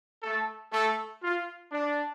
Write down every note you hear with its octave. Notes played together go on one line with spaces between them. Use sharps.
A3 A4
A3 A4
F4
D4